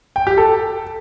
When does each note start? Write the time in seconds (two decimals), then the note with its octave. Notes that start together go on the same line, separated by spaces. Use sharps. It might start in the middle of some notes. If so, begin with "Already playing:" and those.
0.16 G5
0.27 G4
0.38 A4